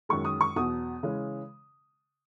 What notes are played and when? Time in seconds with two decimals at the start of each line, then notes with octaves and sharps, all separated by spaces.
0.09 F#2 D#3 G#3 C#6
0.25 D#6
0.41 C#6
0.56 E2 B2 F#3 D#6
1.03 C#3 E3 G#3 C#4